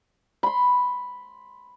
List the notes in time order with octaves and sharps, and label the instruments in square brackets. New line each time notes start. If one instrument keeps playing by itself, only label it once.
[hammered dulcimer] B5 C6